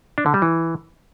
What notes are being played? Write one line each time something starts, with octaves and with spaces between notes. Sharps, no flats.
D4
D3
G3
E3